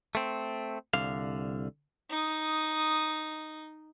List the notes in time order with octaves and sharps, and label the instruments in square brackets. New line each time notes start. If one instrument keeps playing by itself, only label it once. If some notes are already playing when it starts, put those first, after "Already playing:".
[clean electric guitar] A3 C4
C2 D3 F5
[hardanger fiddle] D#4 D#6